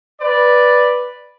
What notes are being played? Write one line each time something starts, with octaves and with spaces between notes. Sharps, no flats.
B4 D5